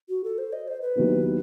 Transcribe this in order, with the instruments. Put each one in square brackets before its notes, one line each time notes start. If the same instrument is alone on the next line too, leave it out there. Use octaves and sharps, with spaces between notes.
[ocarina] F#4
A4
C5
D#5
C5
B4
[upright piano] D#2 D#3 F#3 B3 E4